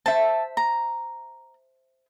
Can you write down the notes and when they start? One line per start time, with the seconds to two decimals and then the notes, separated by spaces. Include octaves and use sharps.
0.06 C5 E5 A5
0.57 A#5